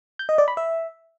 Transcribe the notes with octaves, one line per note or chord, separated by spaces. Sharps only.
G6
D#5
D5
B5
E5